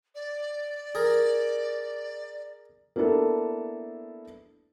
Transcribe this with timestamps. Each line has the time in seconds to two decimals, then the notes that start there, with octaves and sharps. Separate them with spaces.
0.15 D5
0.95 G#4 A#4
2.96 A#3 B3 D4 E4 A4